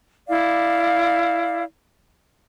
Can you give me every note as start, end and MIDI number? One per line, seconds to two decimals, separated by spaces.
0.28 1.63 64
0.28 1.63 74
0.28 1.63 77